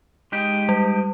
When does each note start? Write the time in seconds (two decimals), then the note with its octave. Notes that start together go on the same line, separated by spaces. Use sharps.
0.32 G#3 D#4 G4
0.69 G3